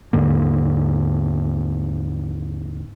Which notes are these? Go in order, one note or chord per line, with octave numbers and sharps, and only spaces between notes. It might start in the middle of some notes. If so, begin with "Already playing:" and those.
D#2 G#2 D3 A#3